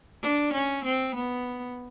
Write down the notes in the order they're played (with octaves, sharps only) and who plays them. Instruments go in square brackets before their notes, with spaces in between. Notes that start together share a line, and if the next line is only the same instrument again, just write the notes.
[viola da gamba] D4
C#4
C4
B3